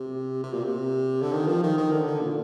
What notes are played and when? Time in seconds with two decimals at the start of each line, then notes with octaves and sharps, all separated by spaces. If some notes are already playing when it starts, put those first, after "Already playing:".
Already playing: C3
0.43 C3
0.53 A#2
0.64 C3
1.22 D3
1.33 D#3
1.47 F3
1.63 D#3
1.78 D#3
1.92 D3
2.07 D3
2.21 A#2